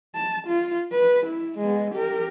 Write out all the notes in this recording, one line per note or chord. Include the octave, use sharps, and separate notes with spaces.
A5
F4
B4
E4
G#3 B3
G4 A#4